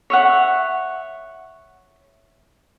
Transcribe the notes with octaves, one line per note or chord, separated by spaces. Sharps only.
C#5 E5 F#5